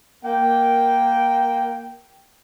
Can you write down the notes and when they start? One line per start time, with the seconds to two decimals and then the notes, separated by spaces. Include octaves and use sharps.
0.25 A#3 G5